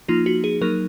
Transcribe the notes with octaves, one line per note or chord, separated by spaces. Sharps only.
F3 A#3 D#4 F4
F#4
G#4
F#3 A#3 D#4 A#4